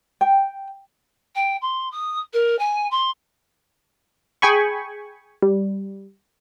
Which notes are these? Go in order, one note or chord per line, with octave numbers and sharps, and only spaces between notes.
G5
G5
C6
D#6
A#4
G#5
C6
G#4 G5 G#5 B5 C#6
G3